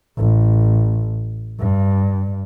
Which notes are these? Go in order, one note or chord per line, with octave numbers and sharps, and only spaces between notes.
A1
G2